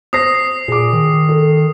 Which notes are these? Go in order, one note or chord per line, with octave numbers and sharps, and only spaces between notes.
C5 D#6 A#6 C7
A#2 G#4 D6
D#3
A4